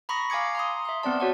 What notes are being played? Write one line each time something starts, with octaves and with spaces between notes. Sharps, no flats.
A#5 B5 C#6 D#6 A#6
F5 G#5 D6 G#6 C#7
A#5 C6 D#6
E5 C6
B3 C4 D5 A5
F#4 C#5 F#5